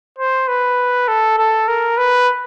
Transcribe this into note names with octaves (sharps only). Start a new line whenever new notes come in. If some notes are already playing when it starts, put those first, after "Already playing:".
C5
B4
A4
A4
A#4
B4